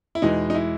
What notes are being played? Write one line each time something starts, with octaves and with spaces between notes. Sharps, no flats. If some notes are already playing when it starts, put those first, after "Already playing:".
E4
E2 B2 G#3 D#4
D#4
E4